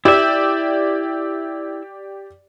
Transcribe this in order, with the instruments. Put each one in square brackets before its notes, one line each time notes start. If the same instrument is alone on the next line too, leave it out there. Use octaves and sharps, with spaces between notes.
[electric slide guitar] E4 E5 [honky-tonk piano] G4 D5